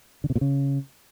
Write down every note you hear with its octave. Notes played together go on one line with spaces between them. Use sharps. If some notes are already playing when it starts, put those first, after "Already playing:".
D3
C3
A#2
C#3